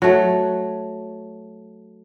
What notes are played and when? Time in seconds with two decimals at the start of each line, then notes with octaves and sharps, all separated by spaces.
0.02 F#3 A3